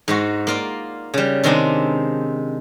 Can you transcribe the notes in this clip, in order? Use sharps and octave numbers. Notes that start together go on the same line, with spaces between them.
G#2 D#4 F#4
A#3 F4 D5
C#3 G3
C3 D#3 G#3 C4 D4 D#4